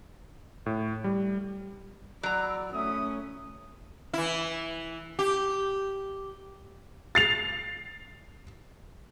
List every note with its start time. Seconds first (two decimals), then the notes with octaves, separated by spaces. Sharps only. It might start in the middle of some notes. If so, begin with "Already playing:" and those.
0.66 A2
1.04 G3
2.23 F#3 D5 A#5 B5 E6
2.74 A3 C#4 E4 E5 D#6
4.13 E3 E4
5.19 G4
7.15 A6 C7 F7